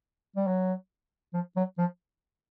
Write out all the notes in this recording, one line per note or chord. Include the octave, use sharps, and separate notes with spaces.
G3
F#3
F3
F#3
F3